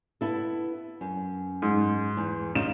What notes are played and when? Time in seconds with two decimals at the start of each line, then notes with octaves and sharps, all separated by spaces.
0.21 B3 E4 A4
1.01 F#2
1.62 G#2
2.17 E2
2.55 C#3 D#4 F4 E7